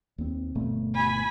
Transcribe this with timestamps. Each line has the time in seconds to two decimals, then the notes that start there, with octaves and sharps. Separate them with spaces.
0.18 D#2 C4
0.55 G1 B2 A3
0.94 G#5 B5